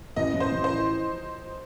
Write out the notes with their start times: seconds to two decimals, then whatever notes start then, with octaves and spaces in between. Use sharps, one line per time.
0.16 A1 D#5
0.34 A1
0.40 C5
0.52 A1
0.64 C5
0.70 E3